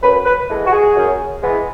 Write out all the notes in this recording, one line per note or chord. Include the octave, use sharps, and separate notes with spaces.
F#2 B4
B4
E3 G#3 B3 A4
F#4
G#4
F#2
E3 G#3 B3